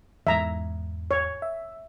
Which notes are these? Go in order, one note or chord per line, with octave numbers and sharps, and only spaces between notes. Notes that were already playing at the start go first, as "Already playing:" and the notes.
E2 G#2 E5 A#5
C#5
E5